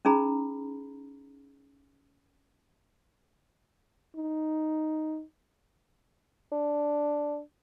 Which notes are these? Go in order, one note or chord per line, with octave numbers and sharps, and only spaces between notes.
C#4 D#4 G#4 A#5 B5
D#4
D4